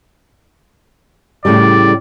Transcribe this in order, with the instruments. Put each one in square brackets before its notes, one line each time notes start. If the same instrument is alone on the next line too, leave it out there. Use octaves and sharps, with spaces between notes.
[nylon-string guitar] A2 C#3 G3 [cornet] D5